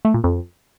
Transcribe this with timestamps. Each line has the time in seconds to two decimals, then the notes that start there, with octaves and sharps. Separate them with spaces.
0.05 A3
0.14 A#2
0.24 F2